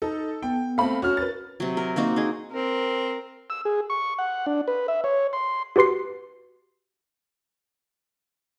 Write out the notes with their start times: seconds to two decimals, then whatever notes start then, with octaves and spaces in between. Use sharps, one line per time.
0.02 D#4 A4
0.43 B3 G5
0.78 A3 C4 F5 B5
1.02 C#4 F#4 F6
1.17 A#4 B4 A6
1.60 C3 F#3
1.77 A#4
1.96 A#3 C4 D#4 F#4
2.16 D#4 G#4
2.52 C4 A#4
3.50 E6
3.65 G#4
3.90 C#6
4.19 F#5
4.46 D4
4.68 B4
4.88 E5
5.04 C#5
5.33 C6
5.76 F#4 G4 B4 C6 C7